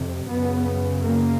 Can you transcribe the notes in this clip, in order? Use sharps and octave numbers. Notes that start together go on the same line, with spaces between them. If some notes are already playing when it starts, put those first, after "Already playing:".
Already playing: F2 C3
F#2 C#3 B3
A#3